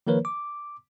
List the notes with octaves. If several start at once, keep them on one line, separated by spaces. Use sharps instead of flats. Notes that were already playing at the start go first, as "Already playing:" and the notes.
D#3 F3 A#3 A#4 B4 C#5
D6